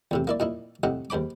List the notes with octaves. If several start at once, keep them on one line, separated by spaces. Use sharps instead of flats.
E2 A2 C3
A#3 E4 D5
A#2 D#4 E4
A2 C3 D#4 F#5
D#2 G#2 C5 B5 D6